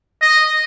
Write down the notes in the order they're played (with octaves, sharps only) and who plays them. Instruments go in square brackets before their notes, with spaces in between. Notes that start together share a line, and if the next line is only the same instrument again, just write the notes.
[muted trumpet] D#5